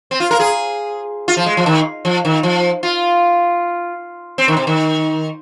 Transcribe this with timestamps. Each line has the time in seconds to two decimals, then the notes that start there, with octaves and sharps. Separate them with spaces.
0.11 C4
0.20 F4
0.31 A#4
0.40 G#4
1.28 F4
1.37 F3
1.46 G#3
1.57 F3
1.66 D#3
2.05 F3
2.25 D#3
2.43 F3
2.83 F4
4.38 C4
4.48 D#3
4.57 C3
4.67 D#3